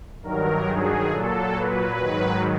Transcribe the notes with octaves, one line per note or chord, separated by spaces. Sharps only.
G2 D#3 F#3 A#4
G#4
A#2 F#3 A4
B4
G#2 D#3 F#3